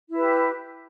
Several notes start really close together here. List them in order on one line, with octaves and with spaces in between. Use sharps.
E4 B4 G4